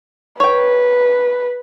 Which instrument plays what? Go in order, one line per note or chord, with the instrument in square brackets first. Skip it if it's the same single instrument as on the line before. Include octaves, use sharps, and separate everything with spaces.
[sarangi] B4 [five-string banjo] C#5 G5